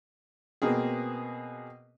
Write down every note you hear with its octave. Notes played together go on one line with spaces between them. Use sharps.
B2 A#3 C4 G#4